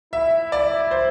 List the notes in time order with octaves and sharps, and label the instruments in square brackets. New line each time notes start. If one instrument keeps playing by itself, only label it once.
[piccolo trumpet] E4 [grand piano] E5
[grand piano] D5
C5